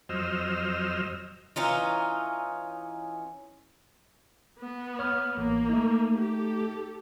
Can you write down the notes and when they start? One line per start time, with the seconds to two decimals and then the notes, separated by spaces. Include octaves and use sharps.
0.09 F2 F#3 C5 D#5 E6 F6
1.56 E3 C#4 D#4 F4
4.59 B3
4.99 C#5 F6
5.37 A1 A#3
5.69 A3 D#4
6.18 G4 A4